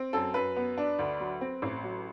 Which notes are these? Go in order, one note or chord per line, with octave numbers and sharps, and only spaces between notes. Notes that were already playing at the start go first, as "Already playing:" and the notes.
Already playing: C4
F#2 A4
F#2 B4
B3
D4
D2
F#3
C4
A1
F#3